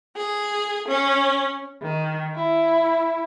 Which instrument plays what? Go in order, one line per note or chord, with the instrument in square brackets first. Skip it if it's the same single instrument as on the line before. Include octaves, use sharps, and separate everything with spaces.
[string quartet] G#4
C#4
[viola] D#3
E4